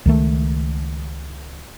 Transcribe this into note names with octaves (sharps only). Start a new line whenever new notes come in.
C#2 D#3 A3